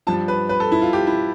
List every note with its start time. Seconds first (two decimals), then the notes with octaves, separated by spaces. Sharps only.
0.07 G2 F3 A5
0.28 B4
0.49 B4
0.60 A4
0.72 E4
0.82 F4
0.93 G4
1.07 E4